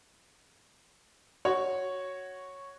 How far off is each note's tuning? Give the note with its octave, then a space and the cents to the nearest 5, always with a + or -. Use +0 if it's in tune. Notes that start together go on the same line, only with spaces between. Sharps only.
F#4 +0 C#5 -5